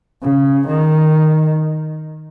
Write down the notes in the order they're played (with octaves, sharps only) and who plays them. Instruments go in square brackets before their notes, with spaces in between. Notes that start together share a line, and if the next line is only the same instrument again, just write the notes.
[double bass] C#3
D#3